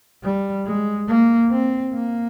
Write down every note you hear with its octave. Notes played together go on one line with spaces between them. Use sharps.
G3
G#3
A#3
C4
A#3